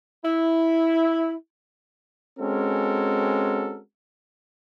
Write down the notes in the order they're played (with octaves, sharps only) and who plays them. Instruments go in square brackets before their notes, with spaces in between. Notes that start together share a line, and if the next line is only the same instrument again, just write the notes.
[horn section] E4
[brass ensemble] G#3 C4 C#4 F#4 A4 A#4